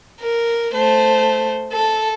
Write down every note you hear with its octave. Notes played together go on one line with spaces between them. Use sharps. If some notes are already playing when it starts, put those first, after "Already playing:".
A#4
A3 C5
A4